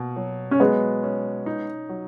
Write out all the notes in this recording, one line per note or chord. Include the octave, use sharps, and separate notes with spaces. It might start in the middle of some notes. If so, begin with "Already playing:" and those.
Already playing: B2 A#3
F#3
C#4
F#3 G#3 B3
C#4
D#4
F#3